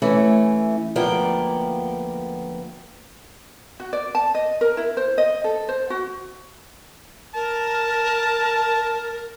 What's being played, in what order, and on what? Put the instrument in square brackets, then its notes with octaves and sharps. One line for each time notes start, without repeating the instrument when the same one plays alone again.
[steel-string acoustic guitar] E3 A3 C#4
D2 F3 A#3 B3 D5 G5
[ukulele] F#4
D5
A5
D#5
A#4
E4
C5
D#5
A4
C5
F#4
[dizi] A#4 [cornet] A5